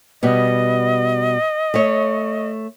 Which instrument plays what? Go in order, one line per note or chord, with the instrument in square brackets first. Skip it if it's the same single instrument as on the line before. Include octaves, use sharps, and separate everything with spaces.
[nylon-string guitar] B2 G3 B3 [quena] D#5
[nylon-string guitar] A3 C#5